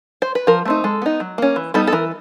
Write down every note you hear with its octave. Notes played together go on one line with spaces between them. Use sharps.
C5
B4
F3 A#4
A3 C4 D#4
G#3 A4
B3 D#4
F#3
A#3 C#4
E3
G3 B3 D#4 A4
A4
E3 A#4